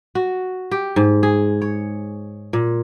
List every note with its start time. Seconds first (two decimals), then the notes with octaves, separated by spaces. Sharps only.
0.15 F#4
0.71 G4
0.96 G#2
1.23 G#4
1.62 C#5
2.53 A#2